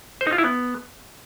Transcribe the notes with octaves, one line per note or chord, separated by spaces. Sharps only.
C5
D#4
F4
E4
B3